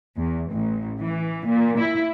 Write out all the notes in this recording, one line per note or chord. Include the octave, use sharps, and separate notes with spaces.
E2
A1
E3
A#2
E4